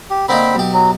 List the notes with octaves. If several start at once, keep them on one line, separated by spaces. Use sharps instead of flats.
G4
D3 A#3 C4 D#4 B5
B1 G4
F#3